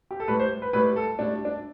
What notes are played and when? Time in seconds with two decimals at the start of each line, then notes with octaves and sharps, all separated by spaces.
0.11 G4
0.20 A4
0.28 A2 G3 B4
0.39 C5
0.62 B4
0.73 A2 G3 B4
0.96 A4
1.19 A2 G3 D4
1.45 D4